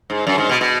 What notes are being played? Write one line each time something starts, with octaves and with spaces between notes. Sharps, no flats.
G#2
F#2
G#2
B2
B2